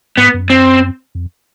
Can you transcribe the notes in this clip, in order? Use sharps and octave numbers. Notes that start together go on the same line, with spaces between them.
G#2 B3
F#2
C4
F2